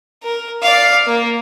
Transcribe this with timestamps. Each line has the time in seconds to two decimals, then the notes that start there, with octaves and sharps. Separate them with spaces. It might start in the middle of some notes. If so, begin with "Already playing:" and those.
0.23 A#4
0.62 D5 F5
1.07 A#3